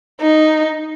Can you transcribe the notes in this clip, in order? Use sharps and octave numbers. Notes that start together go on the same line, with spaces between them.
D#4